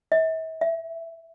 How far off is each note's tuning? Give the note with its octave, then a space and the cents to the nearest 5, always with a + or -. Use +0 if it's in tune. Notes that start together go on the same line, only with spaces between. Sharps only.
E5 -40
E5 +5